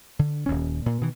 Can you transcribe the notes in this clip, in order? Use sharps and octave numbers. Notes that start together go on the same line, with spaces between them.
D3
D#1 D#2 C#4
A#2
B2 D#3 E3